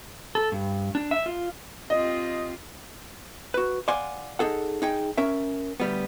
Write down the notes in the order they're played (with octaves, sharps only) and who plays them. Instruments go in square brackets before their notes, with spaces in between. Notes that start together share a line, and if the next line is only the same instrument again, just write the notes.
[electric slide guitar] A4
G2
D4
E5
F4
[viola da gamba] C4 F4 G4 [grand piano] D#5
[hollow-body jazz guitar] F#4 B4
D5 F5 F#5 G#5 C6
D#4 G#4 A4 F#5
D#4 G#4 G5
C#4 A#4 E5
D2 G3 B3